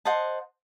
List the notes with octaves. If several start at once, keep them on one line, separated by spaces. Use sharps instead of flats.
C5 D#5 F#5 A5